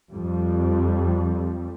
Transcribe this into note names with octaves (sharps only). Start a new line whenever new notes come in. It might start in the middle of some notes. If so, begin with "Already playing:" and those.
F2 G3